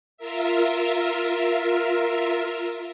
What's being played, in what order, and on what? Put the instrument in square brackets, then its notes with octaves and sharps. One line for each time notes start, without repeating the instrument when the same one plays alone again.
[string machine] F4 A#4 E5